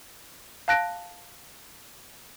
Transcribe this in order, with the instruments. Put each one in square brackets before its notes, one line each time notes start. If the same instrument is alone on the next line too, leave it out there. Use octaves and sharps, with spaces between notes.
[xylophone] F5 A5 F#6 A#6 D7